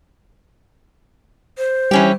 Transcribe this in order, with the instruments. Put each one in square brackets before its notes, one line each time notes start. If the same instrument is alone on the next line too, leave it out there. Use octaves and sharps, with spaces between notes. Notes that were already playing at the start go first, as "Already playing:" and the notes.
[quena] C5
[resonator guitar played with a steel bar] E3 C#4 G4 [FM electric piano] G3